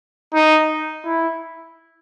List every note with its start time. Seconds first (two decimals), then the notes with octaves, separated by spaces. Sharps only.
0.34 D#4
1.05 E4